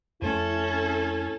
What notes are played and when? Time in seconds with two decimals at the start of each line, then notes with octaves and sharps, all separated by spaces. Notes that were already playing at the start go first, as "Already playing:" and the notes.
0.22 F2 A3 C#4 E4 A4